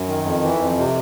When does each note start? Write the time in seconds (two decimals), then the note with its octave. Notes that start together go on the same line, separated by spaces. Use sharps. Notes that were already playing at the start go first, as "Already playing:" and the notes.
Already playing: F#2
0.08 D#3
0.25 F2
0.43 E3
0.60 F2
0.78 C3